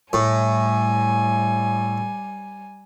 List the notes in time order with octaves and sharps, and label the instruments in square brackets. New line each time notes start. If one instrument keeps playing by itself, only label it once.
[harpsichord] A2 [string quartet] G3 G#5